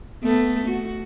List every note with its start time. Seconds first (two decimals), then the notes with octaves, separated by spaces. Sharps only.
0.23 A3 B3
0.67 F#4